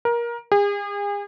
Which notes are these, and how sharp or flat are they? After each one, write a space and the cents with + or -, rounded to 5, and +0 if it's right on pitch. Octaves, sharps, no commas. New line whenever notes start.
A#4 +20
G#4 -40